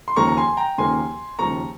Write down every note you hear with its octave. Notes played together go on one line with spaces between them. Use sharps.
C6
D#2 C#3 F3 A#3 A#5 C#6
A#5
G#5 C6
G5 A#5
D#2 C#3 F3 A#3 G#5 C6
D#2 C#3 F3 A#3 A#5 C#6